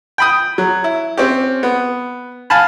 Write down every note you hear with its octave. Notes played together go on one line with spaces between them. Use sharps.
G5 B5 D#6
F#3
E4
C4 C#4 G4
B3
F5 G#5 A5 B5